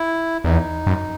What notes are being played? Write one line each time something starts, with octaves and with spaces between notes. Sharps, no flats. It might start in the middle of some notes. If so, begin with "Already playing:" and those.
Already playing: E4
E2 D#4
F#2